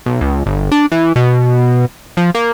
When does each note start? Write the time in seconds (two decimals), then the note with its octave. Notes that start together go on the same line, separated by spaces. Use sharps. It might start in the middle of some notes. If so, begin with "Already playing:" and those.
0.06 B1
0.21 C#2
0.46 G1
0.72 D4
0.92 E3
1.16 B2
2.17 F3
2.35 A#3